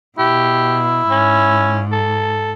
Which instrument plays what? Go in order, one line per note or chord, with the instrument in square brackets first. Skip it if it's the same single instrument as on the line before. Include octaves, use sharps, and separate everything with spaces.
[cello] B2 [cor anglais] E4 [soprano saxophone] G4
[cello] G#2 [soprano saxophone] C#4
[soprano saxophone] A4